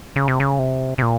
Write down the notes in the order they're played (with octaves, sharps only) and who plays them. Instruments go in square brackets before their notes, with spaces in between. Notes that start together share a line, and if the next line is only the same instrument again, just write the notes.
[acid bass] C#3
C3
C#3
C3
C3
A#2